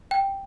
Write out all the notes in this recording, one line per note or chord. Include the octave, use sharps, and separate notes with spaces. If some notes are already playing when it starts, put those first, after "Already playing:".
G5